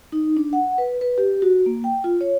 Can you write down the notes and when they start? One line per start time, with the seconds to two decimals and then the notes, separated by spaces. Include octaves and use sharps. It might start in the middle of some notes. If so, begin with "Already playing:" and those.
0.12 D#4
0.37 D4
0.53 F#5
0.78 B4
1.01 B4
1.18 G4
1.42 F#4
1.66 A#3
1.84 G5
2.04 F4
2.21 C#5